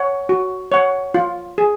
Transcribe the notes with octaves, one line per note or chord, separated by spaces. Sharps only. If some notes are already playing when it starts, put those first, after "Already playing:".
Already playing: C#5 F#5
F#4
C#5 F#5
F4
G#4